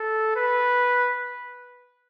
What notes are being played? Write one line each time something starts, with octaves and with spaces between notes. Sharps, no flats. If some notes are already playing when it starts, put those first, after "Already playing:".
Already playing: A4
B4